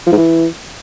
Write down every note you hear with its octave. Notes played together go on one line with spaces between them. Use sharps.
F3
G#2
E3